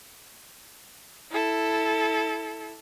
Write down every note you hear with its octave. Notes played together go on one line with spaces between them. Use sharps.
E4 A4